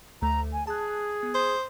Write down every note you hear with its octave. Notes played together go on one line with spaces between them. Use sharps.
D2 A3 A#5
G#5
G#4 A5 F#6
B3
C5 D#6